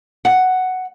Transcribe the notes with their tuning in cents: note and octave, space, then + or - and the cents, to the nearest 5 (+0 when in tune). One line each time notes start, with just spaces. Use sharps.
F#5 +5